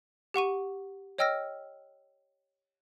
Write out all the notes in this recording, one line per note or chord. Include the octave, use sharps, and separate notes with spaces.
G4 F#5 C#6 D#7
C#5 D#5 G5 E6 F6 A#6